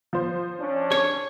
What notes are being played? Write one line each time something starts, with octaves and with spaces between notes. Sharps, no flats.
F3 C5
C#4 D4
C#5